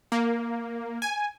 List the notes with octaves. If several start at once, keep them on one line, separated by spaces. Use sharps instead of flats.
A#3
G#5